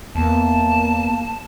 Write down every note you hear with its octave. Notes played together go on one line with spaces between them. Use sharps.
E2 A#3 B3 A5